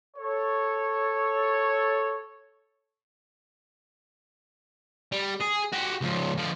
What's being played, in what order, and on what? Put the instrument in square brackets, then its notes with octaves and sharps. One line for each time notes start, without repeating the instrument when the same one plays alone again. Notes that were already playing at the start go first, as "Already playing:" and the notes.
[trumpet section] A4 C#5
[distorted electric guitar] G3
G#4
F#4 G4
C#2 F3
D3 F3